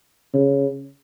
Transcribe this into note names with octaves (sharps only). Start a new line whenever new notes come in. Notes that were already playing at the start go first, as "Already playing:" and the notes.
C#3